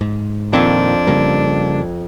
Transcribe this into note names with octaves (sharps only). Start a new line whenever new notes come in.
G#2
F2 A#2 D#3 C4 D4
C#3 G3 A#3